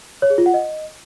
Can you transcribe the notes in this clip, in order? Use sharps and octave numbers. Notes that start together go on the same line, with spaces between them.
C#5
G#4
F4
F#5
D#5